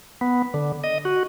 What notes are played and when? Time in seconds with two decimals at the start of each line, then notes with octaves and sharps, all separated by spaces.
0.21 B3
0.54 D3
0.84 D#5
1.05 F#4